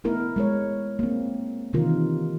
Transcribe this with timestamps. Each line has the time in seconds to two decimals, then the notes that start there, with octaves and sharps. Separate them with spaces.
0.04 A3 B3 E4 A#4
0.36 G#3 A#4 C#5
0.99 A#3 C4
1.73 C3 D#3 E3 F4 A#4